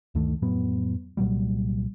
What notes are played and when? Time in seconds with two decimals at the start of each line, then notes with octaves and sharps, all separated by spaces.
0.15 D2 G2 D#3 A3
0.42 F2 A2 F#3 B3
1.17 C2 A#2 F#3 G3